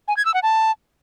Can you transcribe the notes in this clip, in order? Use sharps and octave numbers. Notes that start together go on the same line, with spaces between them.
G#5
G#6
E6
F#5
A5